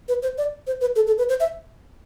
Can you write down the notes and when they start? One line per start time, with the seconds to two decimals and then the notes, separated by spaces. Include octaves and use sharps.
0.08 B4
0.23 C5
0.38 D5
0.67 C5
0.81 B4
0.96 A4
1.07 A4
1.18 B4
1.29 C5
1.40 E5